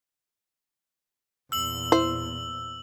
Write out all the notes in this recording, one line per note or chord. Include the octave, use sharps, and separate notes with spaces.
E2 A#2 E6 F#7
E4 C5